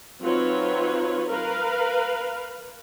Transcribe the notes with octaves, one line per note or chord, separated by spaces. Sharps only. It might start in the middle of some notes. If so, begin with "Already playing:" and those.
F#3 C4 D#4 F4 B4 C#5
A#4 B4 F5